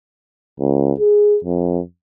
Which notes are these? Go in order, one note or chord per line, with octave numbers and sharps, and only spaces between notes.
C#2
G#4
F2